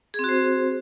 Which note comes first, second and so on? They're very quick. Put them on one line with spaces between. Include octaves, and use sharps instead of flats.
G#4 C4 F#4 C5